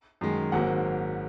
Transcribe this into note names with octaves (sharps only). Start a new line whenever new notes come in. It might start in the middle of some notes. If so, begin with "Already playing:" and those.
F#2 D#3 G#3
G#1 G#2 F#3 A#3 F#5